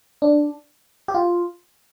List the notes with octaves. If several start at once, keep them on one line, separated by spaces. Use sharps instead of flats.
D4
G4
F4